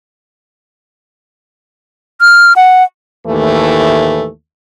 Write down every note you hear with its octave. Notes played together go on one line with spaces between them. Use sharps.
F6
F#5
D#2 A2 E3 A3